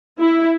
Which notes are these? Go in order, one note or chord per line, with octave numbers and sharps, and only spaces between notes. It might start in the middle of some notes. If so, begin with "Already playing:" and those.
E4